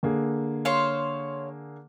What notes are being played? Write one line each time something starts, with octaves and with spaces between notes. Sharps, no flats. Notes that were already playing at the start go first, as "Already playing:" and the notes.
D3 A#3 G#4
C5 C#5 F5